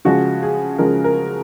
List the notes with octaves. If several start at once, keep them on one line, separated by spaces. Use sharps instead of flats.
C#3 F3 G#3 F#4
G#4
C#3 F3 G#3 A#4
A#4